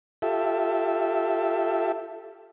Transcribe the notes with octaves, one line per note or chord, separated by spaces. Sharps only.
F4 G4 A4 E5